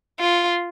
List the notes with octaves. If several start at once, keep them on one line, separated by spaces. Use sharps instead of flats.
F4